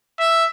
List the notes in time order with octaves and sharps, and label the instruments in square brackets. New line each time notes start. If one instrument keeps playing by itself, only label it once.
[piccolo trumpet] E5